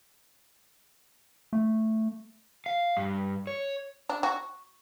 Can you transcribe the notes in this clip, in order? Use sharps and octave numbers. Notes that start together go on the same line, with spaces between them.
A3
F5
G2
C#5
D4
F#4